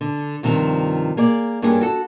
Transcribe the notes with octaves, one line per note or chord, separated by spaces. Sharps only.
D3
G2 C3 D#3 F3
A#3 G#4 D5
G2 A#3 C#4 G4 G#4
F#4 A4